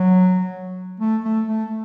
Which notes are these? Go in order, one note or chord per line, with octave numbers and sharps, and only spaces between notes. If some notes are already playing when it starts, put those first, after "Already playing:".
Already playing: F#3
A3
A3
A3